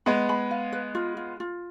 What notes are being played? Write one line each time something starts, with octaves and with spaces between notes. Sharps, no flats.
G#3 B3 B5
B5
F5
B4
F4
F4
F4